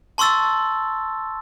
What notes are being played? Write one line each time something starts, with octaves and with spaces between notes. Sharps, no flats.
A5 C6 C#6 E6 A6